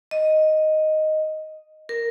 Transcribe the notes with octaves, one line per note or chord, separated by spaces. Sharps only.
D#5
A#4